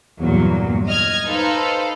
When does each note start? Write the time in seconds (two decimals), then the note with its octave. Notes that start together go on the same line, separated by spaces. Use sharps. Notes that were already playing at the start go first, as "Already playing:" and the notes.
0.19 E2 G2 A#2 F#3
0.87 D#5 F6 G#6
1.25 D#4 A4 B4 C5 F5